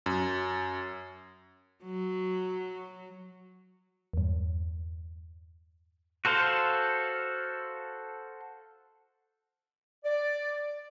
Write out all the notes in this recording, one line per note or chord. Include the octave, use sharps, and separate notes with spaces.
F#2
F#3
E2 G2
F#4 A4 C5 F5
D5